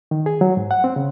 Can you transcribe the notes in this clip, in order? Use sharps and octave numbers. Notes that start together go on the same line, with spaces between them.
D#3
G#4
F#3
G#2
F#5
C4
C#3